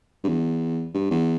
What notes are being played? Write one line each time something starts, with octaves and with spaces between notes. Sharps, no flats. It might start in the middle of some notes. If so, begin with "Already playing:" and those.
G2
E2
G2
E2